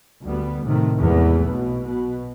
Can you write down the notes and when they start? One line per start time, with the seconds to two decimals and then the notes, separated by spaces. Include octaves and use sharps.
0.23 D2 G3 B3
0.65 A2 C3 D#3 A3
0.98 E2 G#2 E3 A3 B3
1.41 B1 B2
1.84 B2